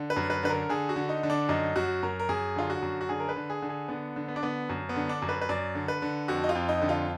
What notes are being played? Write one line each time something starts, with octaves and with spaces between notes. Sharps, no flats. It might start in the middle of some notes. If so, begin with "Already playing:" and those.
Already playing: D3
B4
F#2
B4
D3 B4
A#4
D3 G#4
F#4
D3
D#4
D3
D4
F#2 D#4
F#2 F#4
F#2 A#4
A#4
F#2 G#4
D3 F4
F#4
F#2
F#4
D3 G#4
A#4
B4
D3
G#4
D3
G#4
D3 B3
D3
B3
D4
D3 B3
F#2
B3
D3
D4
F#2
B4
B4
F#2 D5
D3
B4
D3
F2 F#4
D#4
F4
F2
D#4
D3
F4